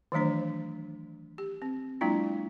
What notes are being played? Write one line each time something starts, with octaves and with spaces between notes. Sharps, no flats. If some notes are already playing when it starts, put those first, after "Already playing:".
D#3 E3 F#3 A3 D4 C5
G4
C4
F#3 G#3 A#3 D4 E4 F4